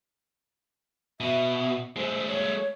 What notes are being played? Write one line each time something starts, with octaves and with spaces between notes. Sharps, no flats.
B2 E5
G#3 A3 C5
C#5